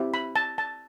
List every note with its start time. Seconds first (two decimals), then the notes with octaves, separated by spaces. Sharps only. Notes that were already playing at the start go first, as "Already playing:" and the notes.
Already playing: C4 E4 G4
0.14 B5
0.36 A5
0.58 A5